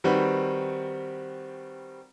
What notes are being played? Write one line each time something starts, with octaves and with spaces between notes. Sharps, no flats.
D#3 G3 C4 F#4 B4